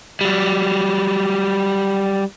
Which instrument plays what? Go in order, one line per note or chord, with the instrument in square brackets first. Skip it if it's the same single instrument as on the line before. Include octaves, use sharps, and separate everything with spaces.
[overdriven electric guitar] F#3 G3